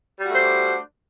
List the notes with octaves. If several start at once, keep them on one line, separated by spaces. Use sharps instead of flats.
G3 A3 D4 F#4 C5